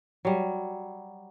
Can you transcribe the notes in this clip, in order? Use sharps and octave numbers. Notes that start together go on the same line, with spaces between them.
F#3 G3